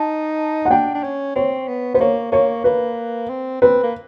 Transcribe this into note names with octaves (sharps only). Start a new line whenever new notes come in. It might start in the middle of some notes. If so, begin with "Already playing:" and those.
Already playing: D#4 A5
F#5
D4 G5
D4
C#4
C4 C#5
B3
B3 C5
A#3 C#5
A#3 C#5
A#3 B4
C4
C4 B4
A#3